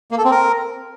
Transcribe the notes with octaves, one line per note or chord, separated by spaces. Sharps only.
A#3
A4
C4
A#4